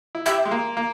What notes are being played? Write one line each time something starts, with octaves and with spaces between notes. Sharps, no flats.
E4
G4 E5
G#3
A#3
A#3